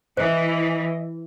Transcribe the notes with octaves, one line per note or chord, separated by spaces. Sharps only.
E3 C5 D#5